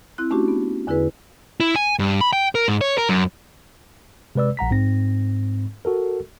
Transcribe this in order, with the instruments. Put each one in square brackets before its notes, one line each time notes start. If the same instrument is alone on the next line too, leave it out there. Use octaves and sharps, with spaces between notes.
[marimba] C4 E4 F#6
A3 C#4 D4 F#4 G4
B3
E2 D3 E4 G#4 B4
[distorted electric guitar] E4
G#5
G2
B5
G5
A#4
G#2
C#5
A#4
F#2
[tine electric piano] C3 G#3 B4 D5 E6
A#1 F#5 A#5 B6
G#2 C4 A#6
F#4 A4 A#4